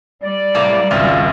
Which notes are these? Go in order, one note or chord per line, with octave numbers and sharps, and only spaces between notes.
G3 D5
A2 C3 A#3
G#1 C#2 F4 E5